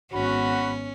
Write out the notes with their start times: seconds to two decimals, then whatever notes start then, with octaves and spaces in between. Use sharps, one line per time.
0.13 G#1 B3 C#4 F#4 B5